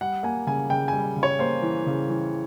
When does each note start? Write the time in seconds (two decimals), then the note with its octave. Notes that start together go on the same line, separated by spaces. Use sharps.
0.01 G3 F#5
0.23 A#3 G#5
0.47 C#3 G#5
0.70 C#3 G5
0.88 G3 G#5
1.17 C#3
1.23 C#5
1.39 A#3 C5
1.62 E3
1.86 C#3
2.10 E3